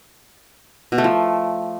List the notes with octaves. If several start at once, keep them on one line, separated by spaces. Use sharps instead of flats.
B2
A3
F3